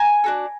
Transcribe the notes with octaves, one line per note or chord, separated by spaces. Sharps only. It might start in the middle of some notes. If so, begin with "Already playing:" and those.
Already playing: G#5 A#5
D4 F#4 A4